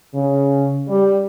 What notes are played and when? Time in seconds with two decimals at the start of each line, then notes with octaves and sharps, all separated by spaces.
0.14 C#3
0.88 G3